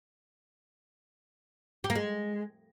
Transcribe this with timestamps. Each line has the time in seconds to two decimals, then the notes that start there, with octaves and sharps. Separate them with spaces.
1.84 G4
1.90 A#3
1.95 G#3